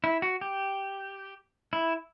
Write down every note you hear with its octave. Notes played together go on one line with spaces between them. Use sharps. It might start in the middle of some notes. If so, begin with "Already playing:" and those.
E4
F#4
G4
E4